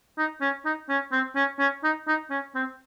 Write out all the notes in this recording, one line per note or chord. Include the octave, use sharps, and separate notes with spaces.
D#4
C#4
D#4
C#4
C4
C#4
C#4
D#4
D#4
C#4
C4